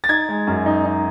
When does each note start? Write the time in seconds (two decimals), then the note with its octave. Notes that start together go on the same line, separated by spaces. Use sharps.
0.04 A6
0.09 D#4 G#6
0.29 G#3
0.47 F#2
0.66 D#4
0.85 D#4